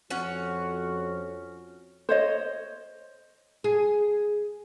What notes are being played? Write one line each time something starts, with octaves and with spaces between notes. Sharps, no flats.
F2 C#4 F#4 F#5
C5 C#5 D#5
G#4